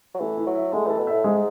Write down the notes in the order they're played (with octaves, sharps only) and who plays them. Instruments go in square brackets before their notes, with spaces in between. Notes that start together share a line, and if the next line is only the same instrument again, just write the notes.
[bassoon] F#3
[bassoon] E3 [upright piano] A3
[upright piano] E4
[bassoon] F#3
[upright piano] E5
[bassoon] G#3 [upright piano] A3
[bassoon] E3 [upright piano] A4
[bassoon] B2
[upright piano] E5
[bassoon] A2
[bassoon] G#2 [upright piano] G#3